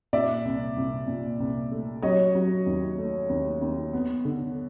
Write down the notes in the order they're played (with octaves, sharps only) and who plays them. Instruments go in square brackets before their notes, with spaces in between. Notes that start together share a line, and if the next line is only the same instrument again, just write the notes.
[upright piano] A#2 D5 E5
C2
C2
A#2
C2
A3
F#3 C#5 D#5
F#3
D#2
A3
D#2
D#2
B3
D3